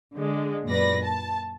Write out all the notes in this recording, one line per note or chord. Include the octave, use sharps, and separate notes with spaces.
D3 G#3
F#2 A#2 B4 D5 A#6
A5